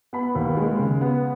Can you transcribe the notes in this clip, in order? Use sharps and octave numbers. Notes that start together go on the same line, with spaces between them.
B3 B5
D#2
G#3
C#3
B3